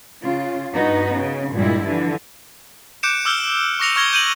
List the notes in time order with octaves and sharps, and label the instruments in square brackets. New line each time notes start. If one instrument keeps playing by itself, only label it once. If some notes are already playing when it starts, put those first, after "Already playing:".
[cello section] C#3 F4
G2 B3 D#4 F#4
C#3
G2 A#2 G3 G#3 E4
D3 E3 F3
[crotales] D6 F#6 G6 C#7 D7 E7
D6 E6 F6 G6 G7
C#6 D6 A#6 C#7 F7
C#6 F6 G#6 A#6 G7
G6 D#7 F#7